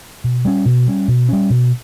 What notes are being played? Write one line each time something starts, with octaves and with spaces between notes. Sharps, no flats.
B2
G3 C#4
B2
G3 C#4
B2
G3 C#4
B2